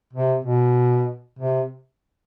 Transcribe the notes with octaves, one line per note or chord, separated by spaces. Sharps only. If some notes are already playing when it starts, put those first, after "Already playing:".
C3
B2
C3